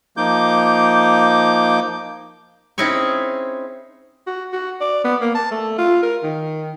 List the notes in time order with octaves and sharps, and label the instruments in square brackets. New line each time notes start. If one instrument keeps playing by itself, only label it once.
[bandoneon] F3 A#3 D#4 D6 G6
[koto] C4 C#4 D#4 E4 G#4 C#5
[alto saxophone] F#4
F#4
D5
B3
A#3
A5
A3
F4
A#4
D#3